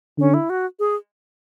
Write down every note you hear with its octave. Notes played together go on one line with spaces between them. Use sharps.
D3 C#4
E4
F#4
G#4